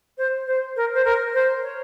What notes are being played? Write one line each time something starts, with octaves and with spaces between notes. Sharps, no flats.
C5
C5
A#4
C5
A#4
C5
C#5